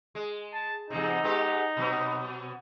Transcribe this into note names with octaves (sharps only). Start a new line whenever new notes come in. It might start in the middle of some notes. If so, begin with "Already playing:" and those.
G#3
A5
E2 G#2 C3 D#4
G#3 B3 G4
B2 F#3 B3